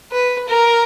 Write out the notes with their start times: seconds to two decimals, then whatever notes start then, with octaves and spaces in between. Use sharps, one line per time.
0.12 B4
0.48 A#4